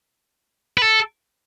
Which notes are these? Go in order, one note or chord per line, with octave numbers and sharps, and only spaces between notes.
B4
A4